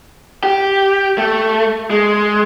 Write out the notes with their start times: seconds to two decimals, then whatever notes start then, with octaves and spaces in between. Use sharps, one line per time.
0.44 G4
1.18 A3
1.90 G#3